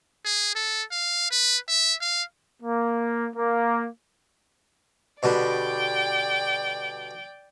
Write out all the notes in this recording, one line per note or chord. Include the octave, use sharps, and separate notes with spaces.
G#4
A4
F5
B4
E5
F5
A#3
A#3
B2 D3 G3 D5 G5